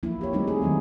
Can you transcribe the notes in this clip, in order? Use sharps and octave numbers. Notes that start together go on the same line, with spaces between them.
F3 A#3 E4
G4 C#5
G3 A3 C4 D#4
G#4
D#3 F#3 G#3 A#3